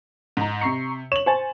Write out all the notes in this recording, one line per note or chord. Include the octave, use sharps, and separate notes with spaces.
G#2 A#5
C3 A#5 C#6 C7 C#7
C#5 E7 F#7
C5 G#5 C#6 A6